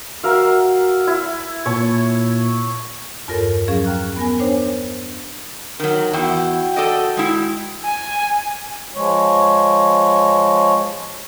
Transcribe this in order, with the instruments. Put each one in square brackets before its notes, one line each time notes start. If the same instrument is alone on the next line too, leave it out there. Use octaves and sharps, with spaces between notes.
[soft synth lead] F#4 [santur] A#4 E5 F5
[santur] E4
[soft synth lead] A#2 [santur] C#5 A5
[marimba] E2 G2 F4 A4 A#4 C#5
F3 F#3 C#4 G#4 F5
G5 A#5 F6 F#6
B3 A#4 G#5
D4 C5 C#5 G5
[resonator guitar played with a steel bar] D#3 F#3 [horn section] A#4
[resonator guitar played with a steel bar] E2 E4 [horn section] F#4 G5
[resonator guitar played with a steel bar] A4 D5 D#5
G#3 E4
[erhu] G#5
[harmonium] F3 G#3 C#5